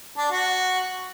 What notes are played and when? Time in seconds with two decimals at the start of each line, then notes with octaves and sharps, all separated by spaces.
0.17 D4
0.31 F#4